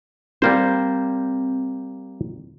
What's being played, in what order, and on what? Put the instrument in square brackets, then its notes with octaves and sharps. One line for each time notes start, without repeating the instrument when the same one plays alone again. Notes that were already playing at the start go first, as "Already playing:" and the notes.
[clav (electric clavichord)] G3 A#3 C5 [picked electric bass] C4